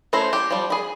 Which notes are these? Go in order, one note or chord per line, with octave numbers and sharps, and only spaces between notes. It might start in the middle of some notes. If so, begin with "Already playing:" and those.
A3 C#4 E4 C5 A#5
G4
F3 G3
G#4 B5